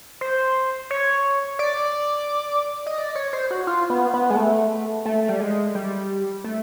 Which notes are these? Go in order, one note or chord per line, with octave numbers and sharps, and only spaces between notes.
C5
C#5
D5
D#5
D5
C#5
C5
F#4
F4
B3
B3
G#3
A3
A3
G3
G#3
G3
A3